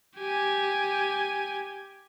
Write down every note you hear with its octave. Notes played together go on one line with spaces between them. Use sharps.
G4 G#5